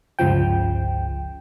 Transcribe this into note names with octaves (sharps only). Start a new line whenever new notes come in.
G1 C#2 C#3 F3 G5